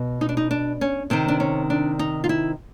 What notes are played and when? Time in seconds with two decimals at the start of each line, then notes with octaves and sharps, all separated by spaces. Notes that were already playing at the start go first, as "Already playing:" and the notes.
Already playing: B2
0.21 D#4
0.29 D4
0.37 D#4
0.51 D4
0.81 C#4
1.10 C3 D#3 C4
1.28 D4
1.40 C#4
1.70 D4
1.99 D#4
2.24 F4
2.29 E4